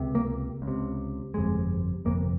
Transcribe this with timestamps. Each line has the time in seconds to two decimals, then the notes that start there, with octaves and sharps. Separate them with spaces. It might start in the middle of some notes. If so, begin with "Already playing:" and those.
Already playing: C#2 C3
0.15 A#3
0.62 C#2
0.68 C3
1.34 G1 F2 C3 G#3
2.05 G1 F2 C3 A#3